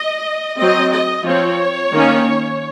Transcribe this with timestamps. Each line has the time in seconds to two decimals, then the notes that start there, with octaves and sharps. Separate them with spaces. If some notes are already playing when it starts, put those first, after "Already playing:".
Already playing: D#5
0.57 F#3 C4 D#5
0.91 D#5
1.24 F3 C4 C#5
1.93 D#3 A#3 C#4